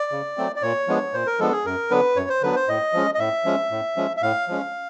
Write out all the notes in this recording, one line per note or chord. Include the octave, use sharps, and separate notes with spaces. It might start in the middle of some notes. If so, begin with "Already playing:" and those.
Already playing: D5
C#3
F#3 A3 C4
D5
A#2 C#5
F3 G#3 B3 D4
A#2 C5
A#4
F3 G#3 B3 D4 A4
G#4
F#2 A#4
D3 F#3 B3 D4 B4
F#2 C#5
C5
D3 F#3 B3 D4 B4
C5
A2 D#5
F3 G#3 C#4
D#5
A2 E5
F3 G#3 C#4
A2
F3 G#3 C#4
E5
A2 F5
F3 G#3 C#4